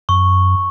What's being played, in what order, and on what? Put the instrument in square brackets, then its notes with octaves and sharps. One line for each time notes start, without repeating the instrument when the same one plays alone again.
[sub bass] F#2 [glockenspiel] C#6